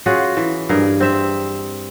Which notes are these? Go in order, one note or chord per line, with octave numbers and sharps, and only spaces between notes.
C#4 F4 F#4 G#4
E3
G2 G#4 A#4
C4 E5